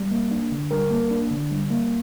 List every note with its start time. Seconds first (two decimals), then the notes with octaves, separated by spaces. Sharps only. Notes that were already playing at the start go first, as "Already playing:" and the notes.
Already playing: G3
0.11 A#3
0.31 D4
0.52 D3
0.71 G3 A#4
0.91 A#3
1.11 D4
1.31 D3
1.51 G3
1.71 A#3